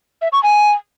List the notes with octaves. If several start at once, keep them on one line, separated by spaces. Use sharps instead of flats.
E5
C#6
G#5